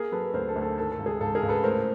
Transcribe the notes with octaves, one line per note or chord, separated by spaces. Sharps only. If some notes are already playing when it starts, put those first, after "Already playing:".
Already playing: A#3 G#4 A#4
F#3 A4 B4
D2 A#4 C5
A4
D2
A4
D#3 A4
A4
C#2
G#4
C#2 A4
G#4 A#4
C#2
A4 B4
A2 A#4 C5